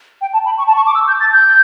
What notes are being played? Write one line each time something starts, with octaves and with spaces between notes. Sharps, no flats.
G5
A5
B5
C#6
A5
C#6
D6
E6
G6
A6
G6